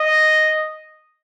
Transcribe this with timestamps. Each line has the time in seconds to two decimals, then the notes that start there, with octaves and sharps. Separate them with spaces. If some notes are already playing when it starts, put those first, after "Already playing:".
Already playing: D#5